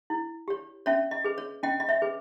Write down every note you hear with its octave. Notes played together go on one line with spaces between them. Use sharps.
E4
G4 C#5
C#4 C#5 E5
D#5
G#4 B4
C#5
C#4 D#5 G5
D#5
C#5 E5
G#4 B4